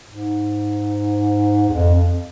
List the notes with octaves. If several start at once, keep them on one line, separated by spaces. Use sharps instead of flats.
G#2
E2
F2
F2